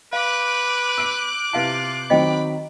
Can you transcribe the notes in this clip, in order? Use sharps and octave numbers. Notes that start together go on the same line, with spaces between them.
B4 F5 D6 F#6 G6
E6 D7
C3 E4 F4 B4 F5 A5
D#3 F#3 C4 D#5 G5 B5